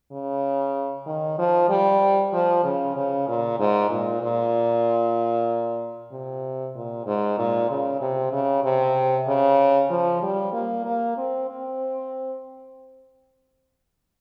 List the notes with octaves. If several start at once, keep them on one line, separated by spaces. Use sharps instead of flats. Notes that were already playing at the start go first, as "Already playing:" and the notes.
C#3
D#3
F3
G3
F3
C#3
C#3
A#2
G#2
A#2
A#2
C3
A#2
G#2
A#2
C#3
C3
C#3
C3
C#3
F3
G3
A#3
A#3
C4
C4